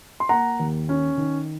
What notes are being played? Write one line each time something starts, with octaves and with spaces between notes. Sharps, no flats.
C6
A#3 F#5 A#5
D#2
C#4
D#3